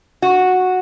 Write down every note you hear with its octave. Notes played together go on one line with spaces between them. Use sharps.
F#4